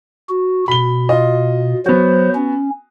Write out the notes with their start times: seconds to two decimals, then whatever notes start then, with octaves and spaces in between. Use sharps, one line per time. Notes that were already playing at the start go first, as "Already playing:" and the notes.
0.29 F#4
0.68 B2 B5 G7
1.09 F4 D#5
1.86 F#3 B3 F#4 C5
2.35 C#4